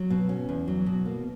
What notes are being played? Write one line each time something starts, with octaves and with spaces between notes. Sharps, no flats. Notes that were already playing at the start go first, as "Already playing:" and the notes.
Already playing: F#3
B2
C#4
E2
F#3
B2
A#3